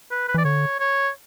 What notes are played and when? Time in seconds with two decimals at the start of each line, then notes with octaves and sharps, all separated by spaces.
0.11 B4
0.28 B4
0.34 E3 D5
0.45 D3 C#5
0.80 C#5